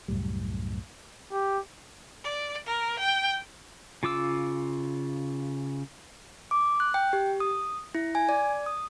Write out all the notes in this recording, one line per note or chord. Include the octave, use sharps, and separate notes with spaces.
C2 F#2 A2 G3
G4
D5
A#4
G5
C#3 F4 D6 E6
D6
F#6
G5
G4
D#6
E4
G#5
D5
D#6